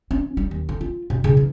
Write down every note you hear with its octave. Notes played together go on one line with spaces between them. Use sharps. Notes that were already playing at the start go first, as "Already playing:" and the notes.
C#4
G3
D#2
D3
F4
B2
C#3
E3